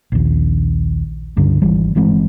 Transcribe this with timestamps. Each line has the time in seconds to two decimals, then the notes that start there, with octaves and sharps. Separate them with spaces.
0.12 A#1 D#2
1.36 C#2 G2 D3
1.62 G#1 E3 G3
1.95 G1 E3 G#3 C4